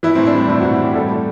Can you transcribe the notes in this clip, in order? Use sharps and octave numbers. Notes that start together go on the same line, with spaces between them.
E3 E4
A2 C4
D4
G3 C4
A2 E4
A2 F#4
E3 G4
G3 A4
A2